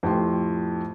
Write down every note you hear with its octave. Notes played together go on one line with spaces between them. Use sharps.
F2 A2 G4 C6